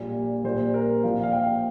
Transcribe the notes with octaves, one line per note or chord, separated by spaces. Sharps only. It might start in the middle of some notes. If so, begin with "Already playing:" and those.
Already playing: A#1 A#2 G3
A#1 A#2 G3 C5
A#4
A#1 A#2 F3 F5
F5
G5